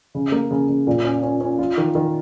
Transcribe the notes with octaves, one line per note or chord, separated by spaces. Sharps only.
C#3
A#3
C#3
C#3
A#2
C#4
C#4
C#4
F4
D#3
D#3